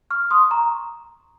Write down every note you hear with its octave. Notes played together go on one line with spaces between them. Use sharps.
C#6 F6
C6 D#6
A#5 C#6